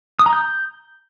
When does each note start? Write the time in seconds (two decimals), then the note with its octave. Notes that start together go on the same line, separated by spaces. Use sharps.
0.19 D#6
0.26 A#5
0.33 G6